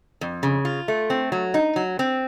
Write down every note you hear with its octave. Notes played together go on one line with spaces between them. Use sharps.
F2
C#3
F4
A3
C4
F#3
D#4
F#3
C4